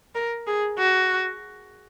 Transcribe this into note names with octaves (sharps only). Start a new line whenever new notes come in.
A#4
G#4
F#4